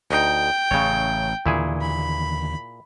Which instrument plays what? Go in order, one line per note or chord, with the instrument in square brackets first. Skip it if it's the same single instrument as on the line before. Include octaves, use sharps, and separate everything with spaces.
[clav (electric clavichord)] D2 D#4 [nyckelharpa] G5
[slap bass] A1 [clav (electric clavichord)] C#3 C#5
[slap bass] D#2 D3 E3 [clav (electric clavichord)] A#2 E4 G#4
[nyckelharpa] B5